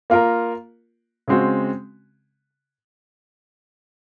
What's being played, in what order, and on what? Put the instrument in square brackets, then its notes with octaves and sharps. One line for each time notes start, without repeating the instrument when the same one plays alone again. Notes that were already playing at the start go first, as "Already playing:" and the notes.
[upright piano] A#3 F4 A#4
C#3 G#3 C4 F#4